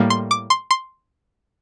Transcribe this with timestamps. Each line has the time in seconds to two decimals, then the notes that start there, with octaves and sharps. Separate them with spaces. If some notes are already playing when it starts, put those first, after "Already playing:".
Already playing: A2 G3 A#3
0.10 C6
0.31 D6
0.50 C6
0.71 C6